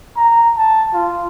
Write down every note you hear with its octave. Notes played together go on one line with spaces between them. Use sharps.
A#5
A5
F4